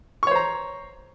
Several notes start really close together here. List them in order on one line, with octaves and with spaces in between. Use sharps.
C#6 C#5 C5 A#5